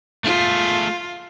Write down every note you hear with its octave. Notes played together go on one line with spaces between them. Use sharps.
A3 F4 G#4